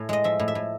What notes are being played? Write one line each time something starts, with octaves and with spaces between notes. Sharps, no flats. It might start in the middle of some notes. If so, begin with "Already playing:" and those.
Already playing: A2 G#5
G#3 D#5
F3 E5
A2
E5
A2